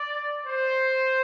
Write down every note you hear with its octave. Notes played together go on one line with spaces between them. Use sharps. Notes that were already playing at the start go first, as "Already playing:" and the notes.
Already playing: D5
C5